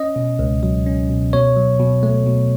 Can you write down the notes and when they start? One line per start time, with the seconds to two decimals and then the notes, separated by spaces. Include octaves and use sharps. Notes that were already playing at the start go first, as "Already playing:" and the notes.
Already playing: C#4 D#5
0.16 B2
0.39 C#2
0.63 F#3
0.86 C#4
1.09 B2
1.33 B2 C#5
1.56 F#3
1.80 B2
2.03 A3
2.27 B2